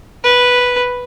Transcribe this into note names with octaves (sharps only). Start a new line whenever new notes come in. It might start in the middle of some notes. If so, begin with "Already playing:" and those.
B4